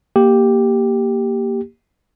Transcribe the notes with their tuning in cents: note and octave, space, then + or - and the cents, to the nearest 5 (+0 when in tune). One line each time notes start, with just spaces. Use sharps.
A#3 +0 G4 +0